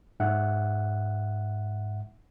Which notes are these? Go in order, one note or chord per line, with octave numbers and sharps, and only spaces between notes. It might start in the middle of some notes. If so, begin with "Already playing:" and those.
G#2 E5 F#5